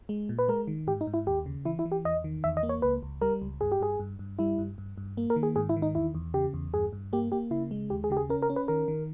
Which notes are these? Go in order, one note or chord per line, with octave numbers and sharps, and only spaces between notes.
G#3
A#2
B4
G#3 A#4
D#3
G#2 G4
D#4
G#2
E4
D#2 G4
C#3
E3 E4
E4
E3
G4
E2 D#5
D#3
E2 E5
D#5
A#3
C#5
C#2 B4
C#2
G3 A#4
C#2
G2 G#4
G4
G2 G#4
G2
G2
G3 E4
G2
G2
G2
A#3
A#4
D#3
G#4
G#2 G#4
E4
D#3
D#4
E2 E4
E2
C#3 G4
E2
G2 G#4
G2
A#3 G4
A#3 G4
C#3 E4
G#3
D#2 G4
G#4
C#3 G4
G#4
C#4 A#4
A#4
C#4
B4
D#3 A#4
D#3